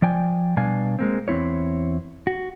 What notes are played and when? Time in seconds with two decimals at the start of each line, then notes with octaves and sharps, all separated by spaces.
0.02 F3 D5 G5 G#5
0.57 B2 G3 D4 F5 G#5
0.99 G#3 A#3 C4
1.28 E2 C4 E4 C#5
2.27 F#4